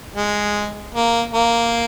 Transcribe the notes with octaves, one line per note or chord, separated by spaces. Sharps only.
G#3
A#3
A#3